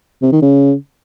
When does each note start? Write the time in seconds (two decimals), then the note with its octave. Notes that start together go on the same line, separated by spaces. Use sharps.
0.22 C3
0.32 D#3
0.42 C#3